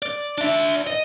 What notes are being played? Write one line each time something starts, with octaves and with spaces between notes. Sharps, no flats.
D5
D4 E5
D#5